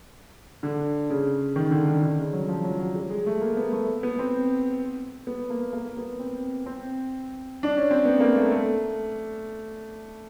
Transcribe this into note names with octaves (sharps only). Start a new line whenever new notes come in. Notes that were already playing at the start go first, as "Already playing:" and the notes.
D3
C#3
D#3
D3
D#3
D3
C#3
F#3
F3
F#3
F#3
G3
G#3
A3
A#3
B3
A3
B3
C4
B3
A#3
A#3
B3
C4
C4
D4
C#4
C4
B3
A#3
A3
A3